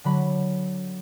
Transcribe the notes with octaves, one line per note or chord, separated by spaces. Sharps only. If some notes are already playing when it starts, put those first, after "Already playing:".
D3 F#3 B5